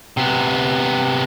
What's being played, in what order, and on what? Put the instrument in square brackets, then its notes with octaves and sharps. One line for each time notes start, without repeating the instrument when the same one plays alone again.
[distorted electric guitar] C3 B3